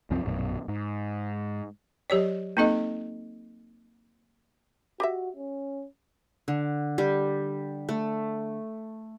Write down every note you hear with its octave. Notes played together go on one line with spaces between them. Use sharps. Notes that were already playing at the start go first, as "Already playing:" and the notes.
C2 F#2 F3 C4
A#1 F#2 B2
G#2
F#3 G4 C#5 D5
A#3 C4 D#4 A4 D#5
F#4 G4 D#5 E5
C#4
D3
G3
A3